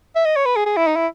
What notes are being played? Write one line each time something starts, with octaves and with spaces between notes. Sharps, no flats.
E5
D#5
C#5
B4
G#4
G#4
E4
D#4
E4